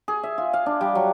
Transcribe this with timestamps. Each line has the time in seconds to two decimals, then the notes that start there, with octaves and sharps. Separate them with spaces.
0.08 G#4
0.23 E5
0.38 F4
0.53 F5
0.66 D4
0.81 G3
0.95 F#3